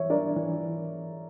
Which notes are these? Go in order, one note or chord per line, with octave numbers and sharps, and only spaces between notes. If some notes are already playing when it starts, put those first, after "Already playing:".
Already playing: E3 C#5 E5
D4 A#4 D5
E3